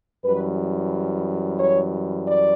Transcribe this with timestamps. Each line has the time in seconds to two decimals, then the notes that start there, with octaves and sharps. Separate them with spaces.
0.24 F#2 E3 G3 B4
1.58 C#5
2.25 D5